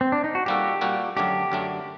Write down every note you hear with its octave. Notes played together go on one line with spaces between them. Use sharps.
C4
D4
D#4
F#4
A#2 G3 A#3 F#4 G4 A4
A#2 G3 A#3 F#4 A4
F#2 D3 F#3 A3 D4 G4
F#2 D3 F#3 A3 D4